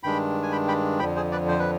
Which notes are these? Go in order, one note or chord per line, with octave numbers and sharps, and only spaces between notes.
G2 D#3 G#3 D4 G5 B5
G#5
G5 B5
G5 B5
F2 D3 F3 G5 B5
G#4 C5
B4 D5
C5
B4